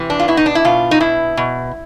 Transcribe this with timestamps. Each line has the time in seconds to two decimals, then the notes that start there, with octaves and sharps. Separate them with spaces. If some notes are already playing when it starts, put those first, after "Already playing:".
Already playing: C3 E3
0.10 D4
0.20 F4
0.28 B2 E4
0.37 D#4
0.46 D4
0.55 E4
0.65 B2 F4
0.91 D#4
1.00 B2 E4
1.37 B2